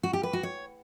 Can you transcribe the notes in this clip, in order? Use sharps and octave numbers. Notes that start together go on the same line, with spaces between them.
F#4
G4
B4
F#4
C#5